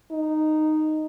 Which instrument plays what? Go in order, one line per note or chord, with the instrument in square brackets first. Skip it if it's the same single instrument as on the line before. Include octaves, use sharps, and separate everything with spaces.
[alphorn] D#4